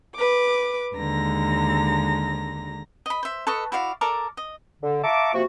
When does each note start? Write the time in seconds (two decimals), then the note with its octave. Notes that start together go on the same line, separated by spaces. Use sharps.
0.15 B4 D6
0.96 D#2 D3 G#3 A#5 A#6
3.06 D#5 B5
3.23 C5 E5
3.47 A4 B4 D#5 C#6
3.72 E4 F#4 D5 F5
4.01 A4 A#4 D5 D6
4.37 D#5
4.82 D3
5.04 E5 F5 A5 A#5 C#6 D6
5.34 C3 F3 A#3 F#4